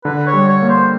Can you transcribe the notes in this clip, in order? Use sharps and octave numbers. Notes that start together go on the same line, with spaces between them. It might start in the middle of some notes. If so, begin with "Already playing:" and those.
D3 B4
C#5
G3
C#5
A#3
C5